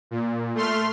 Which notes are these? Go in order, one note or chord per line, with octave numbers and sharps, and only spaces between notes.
A#2
A3 C6 F6